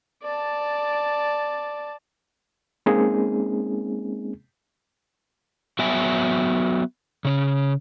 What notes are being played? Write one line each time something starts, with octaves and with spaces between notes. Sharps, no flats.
D5 A5
G#3 A#3 C4 C#4 D#4 G#4
F#3 B3 B4 E5 G5 G#5
C#3 C#4